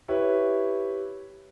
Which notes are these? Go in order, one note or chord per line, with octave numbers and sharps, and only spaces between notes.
E4 G4 B4 C#5 E5